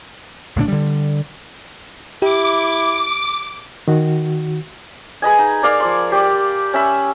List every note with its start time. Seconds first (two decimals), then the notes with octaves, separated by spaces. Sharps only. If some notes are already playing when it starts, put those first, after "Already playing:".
0.56 B1 A2 D3 D4
0.68 D3 G3
2.22 E4 G4 D6
3.88 D#3 F#4
5.22 G#4 B4 D#5 G#5
5.38 D#4
5.62 A#4 D5 F5 D6
5.80 F3 D5 C6
6.12 G4 D5 D6
6.73 C#4 E5 B5